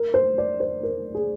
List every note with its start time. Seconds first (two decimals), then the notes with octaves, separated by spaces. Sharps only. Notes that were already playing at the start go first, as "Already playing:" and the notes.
Already playing: A#4
0.14 C5
0.38 D5
0.60 C5
0.83 A#4
1.15 G#4